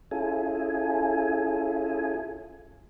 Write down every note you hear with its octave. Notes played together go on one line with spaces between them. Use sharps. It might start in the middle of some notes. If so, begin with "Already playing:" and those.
C#4 E4 F4 G#4 A4 G#5